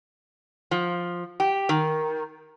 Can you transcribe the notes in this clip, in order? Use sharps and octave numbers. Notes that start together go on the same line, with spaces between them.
F3
G4
D#3